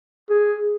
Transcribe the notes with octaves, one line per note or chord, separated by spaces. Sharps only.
G#4